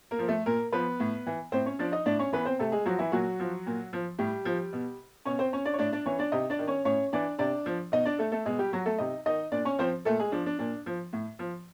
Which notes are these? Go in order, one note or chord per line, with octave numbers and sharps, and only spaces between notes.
A#3 A#4
F3
A3 A4
A#2 A#3 A#4
F3 B3 B4
A2
E3
A2 C4 C5
C#4 C#5
F3 D4 D5
D#4 D#5
A2 D4 D5
C#4 C#5
E3 B3 B4
C4 C5
C3 A3 A4
G#3 G#4
F3 F#3 F#4
E3 E4
A#2 F#3 F#4
F3
A#2
F3
A2 G3 G4
F3
B2
B2 C#4 C#5
C4 C5
C#4 C#5
D4 D5
C#5
A2 D4 D5
D4 D5
E3 C#4 C#5
D4 D5
C3 D#4 D#5
D4 D5
D#3
C#4 C#5
A2 C#4 C#5
E3 D4 D5
C3 D4 D5
F3
B2 D#4 D#5
D4 D5
A3 A4
A3 A4
B2 G#3 G#4
G3 G4
F#3 F#4
A3 A4
C3 D#4 D#5
D#3 D#4 D#5
A#2 D4 D5
C#4 C#5
F3 C4 C5
A#2 A3 A4
G#3 G#4
F3 D4
D4
A#2 D4
F3
A2
F3